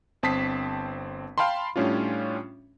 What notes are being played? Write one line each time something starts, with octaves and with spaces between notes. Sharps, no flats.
G1 C4 A5 D#6 B6 C7
F5 G5 A5 B5 C6
A2 G3 C#4 D4 F4